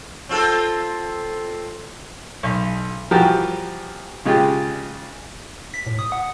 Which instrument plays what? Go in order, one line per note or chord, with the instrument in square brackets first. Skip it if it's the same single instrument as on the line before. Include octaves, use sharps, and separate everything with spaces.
[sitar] C4 F4 A4
[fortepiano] B1
E3 F3 G3 F#4 G4 A#4
C#3 G#3 F4 G4
[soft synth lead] B6
A2
D#6
F#5